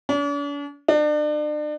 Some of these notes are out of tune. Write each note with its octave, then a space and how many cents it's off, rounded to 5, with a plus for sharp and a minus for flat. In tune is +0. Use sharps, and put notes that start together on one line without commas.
D4 -45
D4 +35